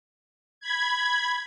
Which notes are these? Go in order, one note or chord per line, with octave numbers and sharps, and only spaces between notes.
B5 G#6